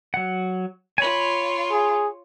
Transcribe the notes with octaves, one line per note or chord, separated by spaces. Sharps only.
F#3 F#5
F4 C#5 G#5 B5
G#4